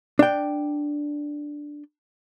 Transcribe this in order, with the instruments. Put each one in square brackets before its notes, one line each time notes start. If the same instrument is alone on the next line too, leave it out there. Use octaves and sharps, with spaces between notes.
[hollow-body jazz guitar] D4 G5